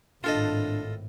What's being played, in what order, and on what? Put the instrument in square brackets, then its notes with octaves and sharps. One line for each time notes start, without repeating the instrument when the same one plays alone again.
[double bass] G#1 A2 [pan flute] D4 [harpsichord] F4 A4 D#5